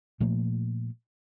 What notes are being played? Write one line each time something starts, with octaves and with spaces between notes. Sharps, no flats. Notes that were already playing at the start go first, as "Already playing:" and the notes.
A#2 F3 A3 A#3